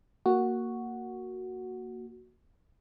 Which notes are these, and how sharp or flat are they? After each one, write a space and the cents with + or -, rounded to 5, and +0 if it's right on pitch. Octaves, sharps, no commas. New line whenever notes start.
A#3 -5 F#4 +0